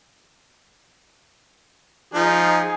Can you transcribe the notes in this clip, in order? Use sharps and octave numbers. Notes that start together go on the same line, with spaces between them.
F3 D#4 G#4